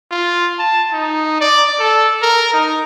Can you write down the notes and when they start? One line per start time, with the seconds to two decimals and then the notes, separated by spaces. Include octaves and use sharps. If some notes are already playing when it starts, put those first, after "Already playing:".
0.11 F4
0.59 A5
0.93 D#4
1.41 D5
1.80 A4
2.23 A#4
2.53 D#4